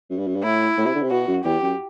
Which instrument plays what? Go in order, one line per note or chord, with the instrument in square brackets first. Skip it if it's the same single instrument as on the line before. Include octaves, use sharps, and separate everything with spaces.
[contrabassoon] F#2
G2
F#2
G2
[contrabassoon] A2 [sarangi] E4
[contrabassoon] A2
C3
D3
C3
[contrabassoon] B2 [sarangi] F#4
[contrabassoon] F#2
[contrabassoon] E2 [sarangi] G4
[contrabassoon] F#2